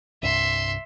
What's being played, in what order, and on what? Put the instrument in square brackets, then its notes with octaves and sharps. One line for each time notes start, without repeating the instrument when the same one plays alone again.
[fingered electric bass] C2 G2 [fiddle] E5 C6